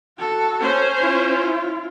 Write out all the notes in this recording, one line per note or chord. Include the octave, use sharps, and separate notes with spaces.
F#4 A4
C#4 C5
E4 F4